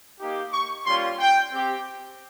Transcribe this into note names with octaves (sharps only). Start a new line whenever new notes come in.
A#3 D#4 G4
C#6
G3 A#3 C#4 F4 C6
G5
C4 G4